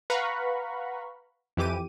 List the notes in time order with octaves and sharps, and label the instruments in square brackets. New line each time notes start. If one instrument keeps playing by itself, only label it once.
[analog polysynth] B4 F5 F#5 A#5 B5 C#6
F2 E3 G4 D6 D#7